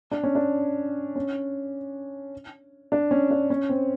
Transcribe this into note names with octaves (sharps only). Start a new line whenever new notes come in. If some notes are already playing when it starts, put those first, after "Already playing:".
D4
C#4
D4
C#4
D4
C#4
D4
C#4
C4